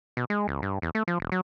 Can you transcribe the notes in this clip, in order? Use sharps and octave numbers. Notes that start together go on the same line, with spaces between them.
B2
G#3
C#2
G2
E2
A3
F3
E1
F#3